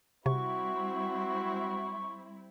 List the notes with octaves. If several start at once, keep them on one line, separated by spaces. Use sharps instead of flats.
C3 G3 C4 E4 F#4 C#6